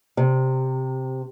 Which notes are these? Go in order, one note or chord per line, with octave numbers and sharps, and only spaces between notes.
C3